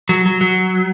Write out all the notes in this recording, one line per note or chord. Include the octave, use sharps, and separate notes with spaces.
F#3
F#3
F#3